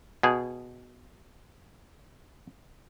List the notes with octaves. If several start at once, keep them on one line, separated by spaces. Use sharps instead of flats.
B2 G#4